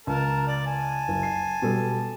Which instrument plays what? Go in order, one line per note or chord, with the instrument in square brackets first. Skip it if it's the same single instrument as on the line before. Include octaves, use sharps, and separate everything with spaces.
[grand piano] C#2 [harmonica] A#4 A5
[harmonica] D5
G#5 A5
[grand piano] F#1
C7
B2 G3 A4